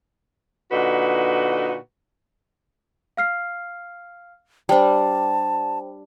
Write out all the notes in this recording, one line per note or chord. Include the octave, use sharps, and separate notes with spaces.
A#2 D3 D#4 F#4 B4
F5 F6 C7
G3 D4 C5 G5 A5